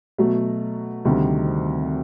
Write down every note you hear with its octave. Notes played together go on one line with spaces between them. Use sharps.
B2 F#3 A3
D2 C3 D#3 G3